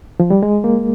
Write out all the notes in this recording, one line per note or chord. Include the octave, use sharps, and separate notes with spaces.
F3
G3
G#3
A#3